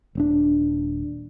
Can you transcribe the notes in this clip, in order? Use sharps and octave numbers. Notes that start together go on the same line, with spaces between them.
D#1 C4 D4